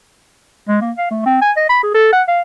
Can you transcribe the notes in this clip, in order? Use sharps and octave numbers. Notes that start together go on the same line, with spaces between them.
G#3
A#3
F5
A3
C4
G#5
D#5
B5
G#4
A4
F#5
F5